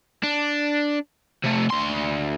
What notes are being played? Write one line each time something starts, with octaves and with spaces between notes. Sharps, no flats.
D4
C3 A3
D2 C6